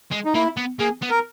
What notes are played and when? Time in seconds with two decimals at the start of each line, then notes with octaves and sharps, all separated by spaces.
0.12 G#3
0.25 D#4
0.34 A#3 E4
0.57 B3
0.80 A#3 G#4
1.02 B3
1.10 A#4